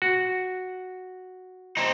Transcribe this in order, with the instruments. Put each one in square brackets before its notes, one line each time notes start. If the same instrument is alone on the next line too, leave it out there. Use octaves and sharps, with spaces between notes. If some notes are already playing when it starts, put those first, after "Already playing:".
[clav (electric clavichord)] F#4
[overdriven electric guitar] C4 D#4